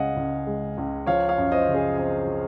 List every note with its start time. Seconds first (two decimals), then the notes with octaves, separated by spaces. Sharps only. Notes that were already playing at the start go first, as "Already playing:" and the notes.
Already playing: C#2 C#3 G#3 D#5 F5 F#5 G#5
0.16 C#2
0.46 G#3
0.77 C#2
1.06 F3 C#5 F5
1.29 C#5 F5
1.38 F#2
1.52 C5 D#5
1.68 C#3
1.74 G#4 C5
1.97 C4 C5 D#5
2.27 F3